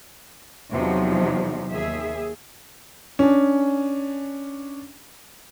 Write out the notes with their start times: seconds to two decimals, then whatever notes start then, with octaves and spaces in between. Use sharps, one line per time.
0.71 E2 C3 F3 F#3 D#4
1.73 D#2 G#4 E5
3.19 C#4 D4